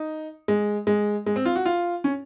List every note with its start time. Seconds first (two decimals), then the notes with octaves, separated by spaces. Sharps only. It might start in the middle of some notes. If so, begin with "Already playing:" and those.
Already playing: D#4
0.48 G#3
0.87 G#3
1.26 G#3
1.36 C4
1.45 F4
1.56 F#4
1.66 F4
2.04 C#4